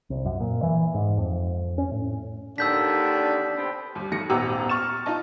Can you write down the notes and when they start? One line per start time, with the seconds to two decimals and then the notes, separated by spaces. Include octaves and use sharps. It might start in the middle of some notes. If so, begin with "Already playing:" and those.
0.10 C2
0.26 F#2
0.40 A#2
0.63 E3
0.94 G#2
1.17 F2
1.78 C#4
1.91 A2
2.58 D#2 D3 D4 E6 G6 B6
3.54 C3 B3 C4
3.95 D#2 G3
4.11 D#2 D#3 A3 A#6 C#7
4.30 D#1 G#1 B3 G4 A#5 E6
4.69 C#6 F6 A6 E7
5.06 D#4 F4 D#5 A5